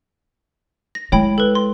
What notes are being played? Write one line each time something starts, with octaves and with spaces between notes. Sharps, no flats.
A#6
G#3 E4 C#5 G5 B5
A4 B4
C6